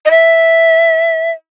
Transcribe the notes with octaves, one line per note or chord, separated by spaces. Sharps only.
D#5
E5